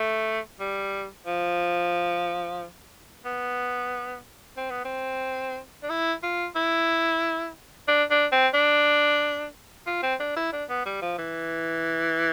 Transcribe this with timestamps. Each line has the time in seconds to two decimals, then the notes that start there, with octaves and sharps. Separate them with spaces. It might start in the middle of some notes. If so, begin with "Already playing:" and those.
Already playing: A3
0.60 G3
1.26 F3
3.25 B3
4.57 C4
4.71 B3
4.85 C4
5.83 D4
5.90 E4
6.23 F4
6.56 E4
7.88 D4
8.11 D4
8.32 C4
8.54 D4
9.87 F4
10.03 C4
10.20 D4
10.36 E4
10.53 D4
10.69 B3
10.86 G3
11.02 F3
11.18 E3